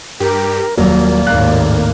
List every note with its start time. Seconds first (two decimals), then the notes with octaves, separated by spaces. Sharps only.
0.20 G2 G4 A#4
0.78 D#1 F#3 A#3 D5
1.27 G#1 D#2 A2 F5 F#6